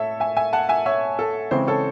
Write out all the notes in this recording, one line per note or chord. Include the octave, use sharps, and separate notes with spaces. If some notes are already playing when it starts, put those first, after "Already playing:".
Already playing: A2 A4 C#5 E5
E5 G#5
E5 G#5
F#5 A5
E5 G#5
C#5 E5
A4
C#3 E3 G#3 C4 C5
A4 C#5